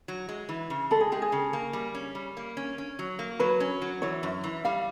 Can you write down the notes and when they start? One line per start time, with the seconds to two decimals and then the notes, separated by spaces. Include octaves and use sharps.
0.08 F#3
0.29 G#3
0.49 E3
0.70 C#3
0.91 G#3 A4
1.01 G#4
1.12 G#3 G4
1.22 G#4
1.32 C#3
1.53 A#3
1.73 G3
1.94 C#4
2.15 G3
2.37 A#3
2.57 C#4
2.78 C#4
2.99 F#3
3.19 A#3
3.40 F#3 B4
3.60 C#4
3.82 F#3
4.02 E3 C#5
4.23 F#2
4.44 E3
4.65 G3 F5